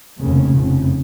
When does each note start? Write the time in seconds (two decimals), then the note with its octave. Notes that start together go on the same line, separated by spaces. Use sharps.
0.19 F1 D#2 C#3
0.55 F1 F2 C#3